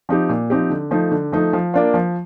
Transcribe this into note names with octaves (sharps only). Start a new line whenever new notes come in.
F3 C4 D#4 G4
A#2
F3 C4 D#4 G4
D3
F3 A3 D#4
D3
F3 A3 D#4
F3
A#3 D4 F4
F3